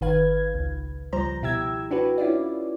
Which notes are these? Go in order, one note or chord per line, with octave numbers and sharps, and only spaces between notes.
G#1 D#3 B4 F5 G#6
C#2
C#2 F3 G3 C5 A#5
B2 E4 G4 E6 G#6
D4 F#4 G4 B4
C#4 E4 F4 D5